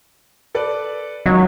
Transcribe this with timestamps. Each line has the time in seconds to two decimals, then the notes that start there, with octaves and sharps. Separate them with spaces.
0.55 A4 B4 D5
1.26 C#2 D#3 F#3